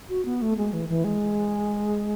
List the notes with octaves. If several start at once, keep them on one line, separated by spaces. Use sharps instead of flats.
F#4
B3
A3
G#3
E3
E3
G#3